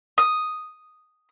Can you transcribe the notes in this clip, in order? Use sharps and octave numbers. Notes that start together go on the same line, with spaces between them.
D#6